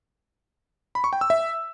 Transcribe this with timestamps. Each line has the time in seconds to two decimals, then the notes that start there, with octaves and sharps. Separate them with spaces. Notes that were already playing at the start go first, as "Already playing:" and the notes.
0.95 B5
1.04 C#6
1.13 G5
1.21 E6
1.30 E5